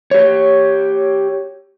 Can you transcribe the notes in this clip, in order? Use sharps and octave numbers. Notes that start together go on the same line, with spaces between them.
G4 C#5